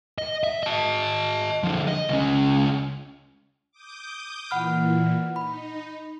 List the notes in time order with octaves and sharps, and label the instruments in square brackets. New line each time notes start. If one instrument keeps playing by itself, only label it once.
[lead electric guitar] D#5
E5
D#5 A5
D3 F3
D#5
C#2 C#4
[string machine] D6 D#6 G6
[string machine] A#2 E3 [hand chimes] F#5 B5 F6
[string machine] D#4 [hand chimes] B5